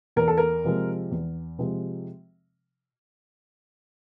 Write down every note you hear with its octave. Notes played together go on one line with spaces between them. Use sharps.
E2 A#4
A4
A#4
C3 F3 G#3
E2
C3 F3 G#3